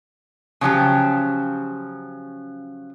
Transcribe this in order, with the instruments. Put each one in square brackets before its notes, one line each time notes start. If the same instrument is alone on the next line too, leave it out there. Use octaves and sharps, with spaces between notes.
[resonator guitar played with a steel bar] C#3 F3 F#3 G4